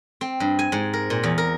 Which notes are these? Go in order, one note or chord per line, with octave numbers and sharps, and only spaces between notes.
C4
G2
G#5
G#2
A#4
A#2
E2
A#4